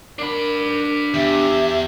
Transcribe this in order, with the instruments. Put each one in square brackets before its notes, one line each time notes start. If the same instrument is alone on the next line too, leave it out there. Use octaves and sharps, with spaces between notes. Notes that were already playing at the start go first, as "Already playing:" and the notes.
[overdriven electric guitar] D4 B5 [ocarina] A#4
[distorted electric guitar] E2 [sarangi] G4 [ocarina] E5